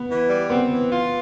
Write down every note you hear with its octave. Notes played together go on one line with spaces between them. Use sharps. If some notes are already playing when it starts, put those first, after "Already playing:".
Already playing: B3
E3
G3
B3 C4
E3
F4